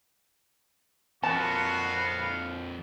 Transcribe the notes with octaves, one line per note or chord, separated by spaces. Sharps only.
F2 B3 F#4 A#4 F5 A5